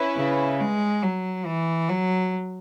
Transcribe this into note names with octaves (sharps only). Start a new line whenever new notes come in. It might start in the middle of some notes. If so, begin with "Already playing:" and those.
Already playing: C#4 E4 B4
C#3
G#3
F#3
E3
F#3